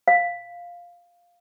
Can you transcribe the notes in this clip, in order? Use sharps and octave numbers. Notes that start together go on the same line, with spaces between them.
F5